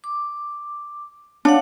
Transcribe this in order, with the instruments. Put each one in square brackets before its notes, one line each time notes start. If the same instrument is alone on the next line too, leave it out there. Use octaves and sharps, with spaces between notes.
[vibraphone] D6
[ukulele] D4 [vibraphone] C#5 F5 F#5